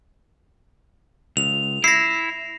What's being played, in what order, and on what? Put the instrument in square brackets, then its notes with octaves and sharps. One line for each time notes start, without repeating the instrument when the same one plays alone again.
[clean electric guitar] C#2 [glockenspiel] F7
[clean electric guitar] E4 [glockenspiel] A#6 C7